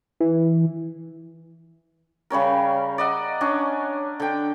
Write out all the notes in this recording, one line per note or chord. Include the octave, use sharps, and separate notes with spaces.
E3
C#3 G3 C#4 A#4
D5 D#5 F#5
C#4 D4 D#5
D3 G5